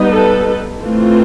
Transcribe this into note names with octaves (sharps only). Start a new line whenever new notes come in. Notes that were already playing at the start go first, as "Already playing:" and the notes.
Already playing: G3 B3 D#4
A4 B4
E3 A3 C4 F4